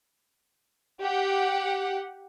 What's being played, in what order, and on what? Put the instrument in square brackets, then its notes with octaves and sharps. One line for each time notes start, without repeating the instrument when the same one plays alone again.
[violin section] G4 F#5